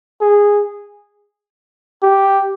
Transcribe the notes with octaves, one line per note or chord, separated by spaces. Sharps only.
G#4
G4